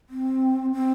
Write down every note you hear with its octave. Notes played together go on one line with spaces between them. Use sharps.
C4
C4